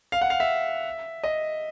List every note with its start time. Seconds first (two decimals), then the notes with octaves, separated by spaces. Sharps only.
0.12 F5
0.21 F#5
0.30 F5
0.40 E5
1.24 D#5